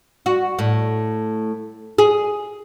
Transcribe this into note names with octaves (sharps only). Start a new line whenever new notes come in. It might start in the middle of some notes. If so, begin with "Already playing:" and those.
F#4
A2
G#4